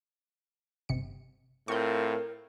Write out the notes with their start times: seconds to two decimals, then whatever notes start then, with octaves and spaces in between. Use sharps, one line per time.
0.89 G1 C3 C#7
1.68 A2 C4 F4 A#4 C#6 G6